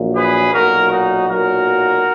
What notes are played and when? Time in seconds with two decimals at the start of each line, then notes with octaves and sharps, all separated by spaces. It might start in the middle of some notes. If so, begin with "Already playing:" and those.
Already playing: A#1 A#2 F#3
0.16 G#4 B4
0.53 B1 A#2 F#3 F#4 A#4
0.91 D#4 F#4
1.28 B1 A#2 F#3 F#4 A#4